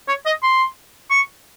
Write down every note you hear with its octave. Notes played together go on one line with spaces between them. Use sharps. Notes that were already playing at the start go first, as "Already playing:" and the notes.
C#5
D#5
C6
C#6